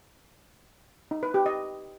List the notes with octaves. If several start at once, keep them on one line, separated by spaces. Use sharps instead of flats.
D#4
B4
G4
D#5